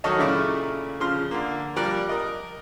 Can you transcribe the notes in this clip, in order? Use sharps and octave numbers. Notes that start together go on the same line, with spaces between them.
D#3 F#3 A3 C#5 D#5 A5
A#2 C#3 A3 E4 D6 F6
C#3 F3 C6 F6
D3 A#3
F3 G3 A#4 D5 F#6
A#4 D#5